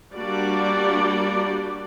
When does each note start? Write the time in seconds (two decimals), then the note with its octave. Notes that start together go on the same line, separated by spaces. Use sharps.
0.15 G3 A#3 D4 F#4 D5